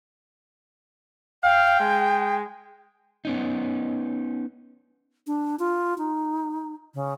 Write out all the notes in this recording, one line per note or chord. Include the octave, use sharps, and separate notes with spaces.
F5 G5
G#3
B3 C#4 D#4
D4
F4
D#4
C#3